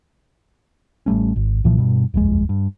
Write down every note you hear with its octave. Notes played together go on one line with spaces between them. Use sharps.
A1 G3 A3 C#4
G#1
C2 A#2 E3 F3
G2 B2
D#1 A#1 F2 G#3
G2